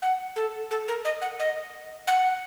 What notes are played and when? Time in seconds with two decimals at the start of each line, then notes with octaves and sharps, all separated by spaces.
0.02 F#5
0.36 A4
0.71 A4
0.88 A#4
1.05 D#5
1.22 F#5
1.39 D#5
2.07 F#5